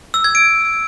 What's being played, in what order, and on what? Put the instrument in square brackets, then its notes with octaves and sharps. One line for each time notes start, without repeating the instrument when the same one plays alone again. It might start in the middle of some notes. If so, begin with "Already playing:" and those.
[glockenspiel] E6
G#6
D7